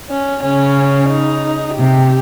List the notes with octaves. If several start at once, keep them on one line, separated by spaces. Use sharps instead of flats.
C#4
C#3 C#4
D#4
C3 G4